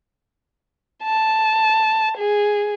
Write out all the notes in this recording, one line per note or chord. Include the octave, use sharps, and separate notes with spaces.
A5
G#4